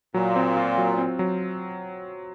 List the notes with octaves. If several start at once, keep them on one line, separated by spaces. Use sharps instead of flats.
A#2 F#3
C4
F4
F#3
C4
F#3